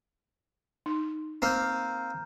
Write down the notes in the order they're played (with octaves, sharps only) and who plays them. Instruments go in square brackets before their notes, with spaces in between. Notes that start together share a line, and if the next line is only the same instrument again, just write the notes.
[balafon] D#4
[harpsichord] A#3 C4 [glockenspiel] A#5 F6 G6